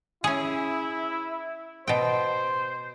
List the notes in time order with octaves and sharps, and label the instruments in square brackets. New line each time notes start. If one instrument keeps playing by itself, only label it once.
[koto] C#4 G#4 [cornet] E4
[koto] B2 G5 [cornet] C5